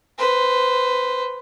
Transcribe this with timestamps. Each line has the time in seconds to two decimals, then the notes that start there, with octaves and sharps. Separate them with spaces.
0.18 B4 C5